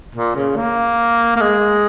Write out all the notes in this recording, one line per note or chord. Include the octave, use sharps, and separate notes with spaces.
A#2
C#3
A#3
A#3
G#3